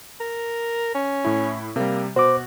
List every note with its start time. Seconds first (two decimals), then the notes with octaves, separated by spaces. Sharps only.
0.20 A#4
0.95 C#4
1.25 A2 E4
1.76 C3 G3 A#3
2.16 B2 F#4 C5 D6